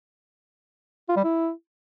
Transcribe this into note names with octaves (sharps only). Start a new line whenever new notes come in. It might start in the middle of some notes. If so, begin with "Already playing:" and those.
F4
G3
E4